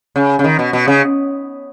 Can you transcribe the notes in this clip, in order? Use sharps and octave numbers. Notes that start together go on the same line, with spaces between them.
C#3
C#3
D#3
B2
B2
C#3